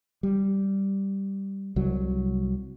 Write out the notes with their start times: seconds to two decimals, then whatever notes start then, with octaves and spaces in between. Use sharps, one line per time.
0.23 G3
1.76 C2 F#3